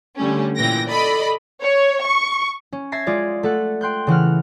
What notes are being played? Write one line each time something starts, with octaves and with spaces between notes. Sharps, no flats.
D3 G3 A3 C#4
A#2 E3 G5 A#6
A4 D5 D#5 B5
C#5
C#6
C#4
E5 A5 G#6 A#6 C7
G#3 F4 G#4 D5
A3 A4 F#5
G5 C6 F#6 G6
C#3 E3 F#5 F6